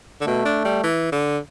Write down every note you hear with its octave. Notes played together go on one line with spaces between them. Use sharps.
D3
B2 A3
D4
G3
E3
D3